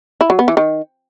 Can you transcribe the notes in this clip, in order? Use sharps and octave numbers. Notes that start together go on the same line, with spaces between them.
E4
F#3
B3
E3
D#3